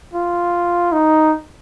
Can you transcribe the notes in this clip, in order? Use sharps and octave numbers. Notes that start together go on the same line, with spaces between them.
F4
D#4